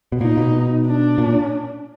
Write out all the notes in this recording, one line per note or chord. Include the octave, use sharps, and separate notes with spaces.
B2
A#2 D#4
B2
D4
A#2